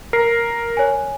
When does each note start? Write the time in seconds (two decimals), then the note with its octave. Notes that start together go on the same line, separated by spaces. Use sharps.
0.13 A#4 C7
0.77 C#5 G#5